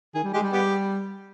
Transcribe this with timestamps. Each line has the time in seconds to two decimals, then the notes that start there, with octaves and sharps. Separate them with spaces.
0.15 D#3 G#4
0.24 G3
0.33 G#3 G4
0.43 G3
0.52 B3 G4